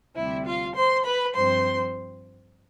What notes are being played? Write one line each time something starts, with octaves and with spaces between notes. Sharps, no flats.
D2 C3 G3 C4 E4 E5
F4 F5
C5 C6
B4 B5
G2 F3 C4 C5 C6